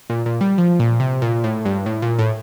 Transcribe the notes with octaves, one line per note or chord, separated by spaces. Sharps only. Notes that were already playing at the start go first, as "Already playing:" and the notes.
A#2
A#2
G3
F3
A#2
C3
A#2
A2
G2
A2
A#2
A2